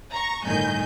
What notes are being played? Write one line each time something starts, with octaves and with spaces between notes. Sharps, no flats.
A#5 C#6
G1 A2 D#3 G#5 G6